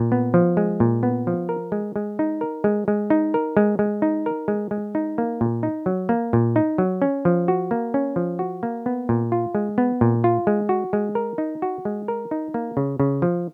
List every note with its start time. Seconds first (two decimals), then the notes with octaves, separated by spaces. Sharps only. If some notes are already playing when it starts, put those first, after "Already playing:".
Already playing: A#2
0.12 B3
0.34 F3
0.57 G#3
0.80 A#2
1.03 B3
1.27 F3
1.49 A#4
1.72 G#3
1.96 G#3
2.19 D#4
2.41 A#4
2.64 G#3
2.88 G#3
3.10 D#4
3.34 A#4
3.57 G#3
3.79 G#3
4.02 D#4
4.26 A#4
4.48 G#3
4.71 G#3
4.95 D#4
5.18 A#3
5.41 A#2
5.63 D#4
5.86 F#3
6.09 A#3
6.33 A#2
6.56 D#4
6.78 F#3
7.02 C#4
7.25 F3
7.48 F#4
7.71 A#3
7.94 C#4
8.16 F3
8.39 F#4
8.63 A#3
8.86 B3
9.09 A#2
9.32 F4
9.55 G#3
9.78 B3
10.01 A#2
10.24 F4
10.47 G#3
10.69 F#4
10.93 G#3
11.15 A#4
11.38 D#4
11.62 F#4
11.85 G#3
12.08 A#4
12.31 D#4
12.54 A#3
12.77 C#3
13.00 C#3
13.22 F3